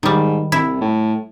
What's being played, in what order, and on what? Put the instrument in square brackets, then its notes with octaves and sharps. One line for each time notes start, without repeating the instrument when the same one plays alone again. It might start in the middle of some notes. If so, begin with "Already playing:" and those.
[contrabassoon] G#2 [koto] D#3 G3
[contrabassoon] C2 [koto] E4
[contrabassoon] A2